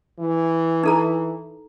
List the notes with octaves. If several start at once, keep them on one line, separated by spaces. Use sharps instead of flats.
E3
D#4 A4 A#5